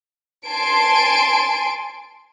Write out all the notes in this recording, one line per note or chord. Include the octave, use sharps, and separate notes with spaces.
G#5 A5 C6 D7